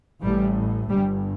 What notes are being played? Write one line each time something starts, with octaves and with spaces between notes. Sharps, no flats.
A1 A2 G3
G1 G2 G3